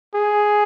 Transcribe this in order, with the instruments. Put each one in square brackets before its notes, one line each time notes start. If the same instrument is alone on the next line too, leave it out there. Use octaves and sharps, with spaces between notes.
[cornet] G#4